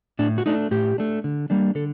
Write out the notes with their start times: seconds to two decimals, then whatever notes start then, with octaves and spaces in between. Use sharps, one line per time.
0.19 A2 D4
0.38 F#4
0.46 A3 D4 D#4
0.71 A2 G4
0.98 A3 D4
1.24 D3
1.50 G3 A#3 D4
1.75 D3 A4